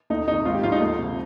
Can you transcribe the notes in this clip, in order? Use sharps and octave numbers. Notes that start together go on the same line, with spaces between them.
D2 D#4
C3 D#3 D#4
G#1 F4
G4
G#2 F3 F4
D#4
D2
C3 F3